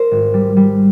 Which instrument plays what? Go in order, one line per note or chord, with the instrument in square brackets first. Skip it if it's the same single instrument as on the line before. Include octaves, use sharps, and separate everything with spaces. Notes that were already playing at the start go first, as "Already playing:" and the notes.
Already playing: [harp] A#4 C5
G#1
G3
G3